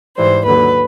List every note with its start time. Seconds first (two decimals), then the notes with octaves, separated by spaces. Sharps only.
0.17 G#2 E3 G3 C5
0.45 D#2 D3 F#3 B4